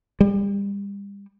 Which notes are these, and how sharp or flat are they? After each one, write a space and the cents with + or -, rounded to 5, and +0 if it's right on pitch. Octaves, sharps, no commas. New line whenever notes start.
G3 +35